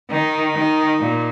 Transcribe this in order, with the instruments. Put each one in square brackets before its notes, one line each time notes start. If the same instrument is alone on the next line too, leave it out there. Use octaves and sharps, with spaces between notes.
[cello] D#3 [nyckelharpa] D#4
[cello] D#3
A#2